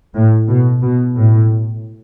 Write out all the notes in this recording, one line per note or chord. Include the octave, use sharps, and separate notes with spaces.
A2
B2
B2
A2